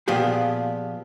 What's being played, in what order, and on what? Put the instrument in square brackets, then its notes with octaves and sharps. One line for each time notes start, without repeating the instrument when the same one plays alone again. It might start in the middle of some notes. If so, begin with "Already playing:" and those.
[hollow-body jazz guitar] A#2 F3 B3 G4 G#4